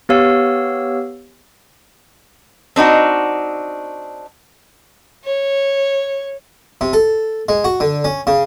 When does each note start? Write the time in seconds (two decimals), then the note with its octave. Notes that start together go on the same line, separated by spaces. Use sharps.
0.09 B3 G4 C#5 F5 E6
2.76 C4 D4 D#4 F#4
5.24 C#5
6.81 C3
6.93 A4
7.49 G#3
7.64 F#4
7.80 D3
8.04 C#4
8.27 C#3